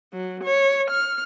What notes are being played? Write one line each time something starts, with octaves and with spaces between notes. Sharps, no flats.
F#3
C#5
F6